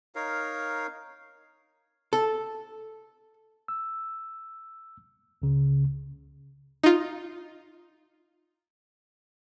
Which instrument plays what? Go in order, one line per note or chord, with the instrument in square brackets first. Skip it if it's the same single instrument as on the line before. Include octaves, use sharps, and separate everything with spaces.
[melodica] D#4 A#4 C#5 F5
[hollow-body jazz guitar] A4
[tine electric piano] E6
C#2 C#3
[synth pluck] D#4 F4